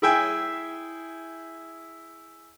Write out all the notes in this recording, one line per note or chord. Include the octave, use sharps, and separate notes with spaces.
E4 G#4 E5 G5 G#5